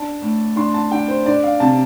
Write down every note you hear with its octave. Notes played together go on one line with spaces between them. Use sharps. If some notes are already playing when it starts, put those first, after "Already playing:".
Already playing: D4 A5
A2
D4 C6
A5
D4 G5
C5
D4 D5
F5
C3 A5